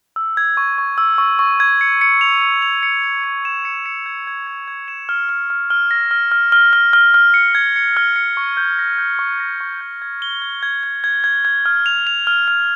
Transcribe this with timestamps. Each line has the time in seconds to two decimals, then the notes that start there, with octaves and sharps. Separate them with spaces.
0.16 E6
0.37 G#6
0.57 C#6
0.78 C#6
0.98 E6
1.18 C#6
1.39 C#6
1.60 G#6
1.81 C#7
2.01 C#7
2.21 F7
2.41 C#7
2.62 F7
2.83 C#7
3.04 C#7
3.24 C#7
3.45 E7
3.65 C#7
3.86 C#7
4.06 G#6
4.27 G#6
4.47 G#6
4.68 G#6
4.88 E7
5.09 F6
5.29 F6
5.50 F6
5.70 F6
5.91 A#6
6.11 F6
6.32 F6
6.52 F6
6.73 F6
6.93 F6
7.14 F6
7.34 C#7
7.55 G#6
7.76 C#7
7.97 F6
8.16 C#7
8.37 C#6
8.57 G6
8.79 A#6
8.98 G6
9.19 C#6
9.40 A#6
9.60 C#6
9.81 G6
10.02 G#6
10.22 G7
10.42 G#6
10.63 G#6
10.83 G#6
11.04 G#6
11.24 G#6
11.45 G#6
11.66 F6
11.86 F7
12.07 F7
12.27 F6
12.48 F6